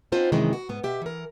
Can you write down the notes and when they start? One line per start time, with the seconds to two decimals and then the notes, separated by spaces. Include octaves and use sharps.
0.12 B3 C4 D4 D#4 F4 C5
0.32 F#2 C3 D#3 E3 G#3
0.53 F#4
0.69 G#2 B3
0.84 B2 G4 E5
1.02 E3 A#4